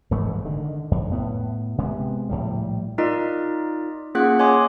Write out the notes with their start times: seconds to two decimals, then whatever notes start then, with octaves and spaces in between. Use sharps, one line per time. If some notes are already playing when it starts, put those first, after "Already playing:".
0.11 F1 G#2 E3 A3
0.45 D3 D#3
0.91 F2
1.12 A2 B3
1.78 C3 G#3 B3
2.29 A#1 F2 A2 G3
2.98 D#4 F4 A#4 D5 D#5
4.15 A#3 C#4 F4 G#4 F#5 F#6
4.39 C#5 D#5 G#5 C6 D6 D#6